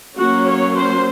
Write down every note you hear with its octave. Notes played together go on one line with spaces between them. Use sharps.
F#3 A#3 C#4 F#4
C#5
C5